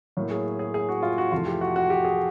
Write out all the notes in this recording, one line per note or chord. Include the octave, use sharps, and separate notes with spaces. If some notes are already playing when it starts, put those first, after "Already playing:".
A2 F#3 A#3
G#4
G#4
G#4
F#4
F4
F#4
F2 C3 E3 A3 F4
G4
F#4
F#4
G4
G#4